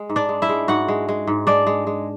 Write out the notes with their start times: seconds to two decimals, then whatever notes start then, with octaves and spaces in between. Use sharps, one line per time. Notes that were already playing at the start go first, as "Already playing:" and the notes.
Already playing: G#3
0.09 G#2
0.16 D4 D5
0.29 G#3
0.42 E4 E5
0.49 G#3
0.68 G#2 F#4 F#5
0.88 G#3
1.09 G#3
1.27 G#2
1.47 G#3 D4 D5
1.67 G#3
1.87 G#3